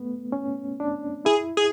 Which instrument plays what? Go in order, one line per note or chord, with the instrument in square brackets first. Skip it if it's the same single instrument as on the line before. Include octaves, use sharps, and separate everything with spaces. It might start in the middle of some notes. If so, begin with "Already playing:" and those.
Already playing: [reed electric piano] A3 B3
C#4
D4
[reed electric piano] E4 [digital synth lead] G#4
[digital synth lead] G#4